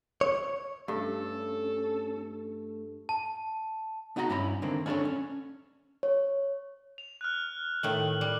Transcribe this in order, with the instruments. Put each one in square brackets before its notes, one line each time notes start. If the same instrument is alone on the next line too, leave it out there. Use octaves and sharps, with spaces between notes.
[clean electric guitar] C#5
[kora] G2 [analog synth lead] A3 [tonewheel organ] C#4 [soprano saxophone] A4
[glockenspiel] A5
[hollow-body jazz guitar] B3 D#4 F#4 F#5 G5 A#5
G2 C#4 E4 B5
D3 D#3 A#3 C4
C#4 D4 E4 A4 C#5
C#4
[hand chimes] C#5
[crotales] F7
F6 F#6
[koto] A2 D#3 A3 [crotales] F#7
[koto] G3